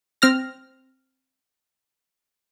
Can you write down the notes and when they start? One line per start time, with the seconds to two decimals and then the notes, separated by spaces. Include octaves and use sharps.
0.22 C4 F6 A#6